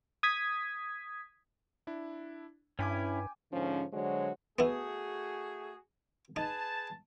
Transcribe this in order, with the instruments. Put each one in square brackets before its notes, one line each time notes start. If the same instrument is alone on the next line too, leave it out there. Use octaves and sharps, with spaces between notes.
[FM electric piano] D#6 G#6 B6
[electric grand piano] D4 E4
[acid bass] G2 [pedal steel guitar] C#4 E4 [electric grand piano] G5 G#5 D6
[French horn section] G#2 D3 F3 C#4
D3 F#3 G#3 F#4 C5 C#5
[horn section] A3 F#4 G#4 [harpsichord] B3 E4
[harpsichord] D#4 [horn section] G#4 B4 A5